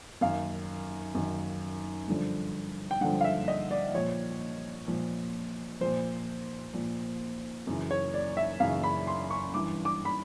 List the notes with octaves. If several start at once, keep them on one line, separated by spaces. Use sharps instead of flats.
F#2 D#3 F5
F#2 D#3
G2 D3 F3
G5
G2 D3 F3 F#5
F5
E5
D#5
D5
A#2 F3 C#5
A#2 F3
A#2 F3 C5
A#2 F3
F#2 C#3 E3
C#5
D5
E5
F#2 C#3 E3 F5
B5
C6
C#6
G2 E3 D6
D6
B5